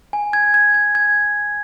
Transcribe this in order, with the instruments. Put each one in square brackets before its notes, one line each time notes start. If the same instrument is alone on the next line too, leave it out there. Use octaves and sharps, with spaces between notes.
[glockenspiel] G#5
G#6
G#6
G#6
G#6